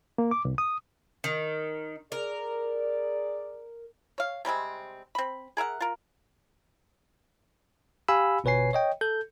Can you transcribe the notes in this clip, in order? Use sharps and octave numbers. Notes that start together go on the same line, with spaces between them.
A#3
D6
C2
D#6
D#3
G#4 A#4 D5
C#5 F5
C3 G3 G#3 C4
C4 B5
G#4 A#4 E5 F#5
F4 A#4
G4 F5 G#5 B5 E6
G1 B2 B4 C#5 G#5 C7
C#5 D#5 G5
A4 G6